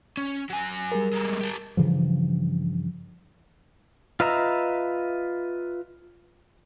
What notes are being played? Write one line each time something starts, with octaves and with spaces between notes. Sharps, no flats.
C#4
F#3 G#5
G3 G#4 A#4
G#3 A#3
G4 A4
G2 C#3 E3 F3
F4 B4 D#5 E5 A#5